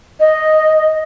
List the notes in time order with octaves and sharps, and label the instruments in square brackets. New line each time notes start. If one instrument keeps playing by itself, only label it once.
[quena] D#5